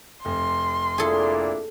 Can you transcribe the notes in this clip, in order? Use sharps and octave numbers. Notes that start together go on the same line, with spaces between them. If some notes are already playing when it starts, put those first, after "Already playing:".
F1 C6
A#2 D4 E4 G#4 A4